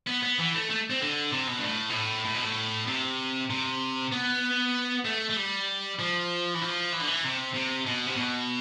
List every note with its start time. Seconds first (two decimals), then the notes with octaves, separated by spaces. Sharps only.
0.07 B3
0.22 B3
0.39 E3
0.54 A3
0.70 A3
0.90 C4
1.01 D3
1.32 C3
1.47 B2
1.58 G2
1.63 A2
1.90 B2
1.93 A2
2.25 A2
2.34 B2
2.42 A2
2.87 C3
3.50 C3
4.12 B3
5.05 A3
5.30 A3
5.36 G3
5.99 F3
6.54 E3
6.62 F3
6.92 E3
7.00 D3
7.07 E3
7.24 C3
7.54 C3
7.86 B2
8.06 C3
8.16 B2